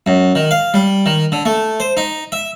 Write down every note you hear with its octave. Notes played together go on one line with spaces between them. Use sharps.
F#2
D#3
F5
G3
D#3
D3
A3
C5
D#4
E5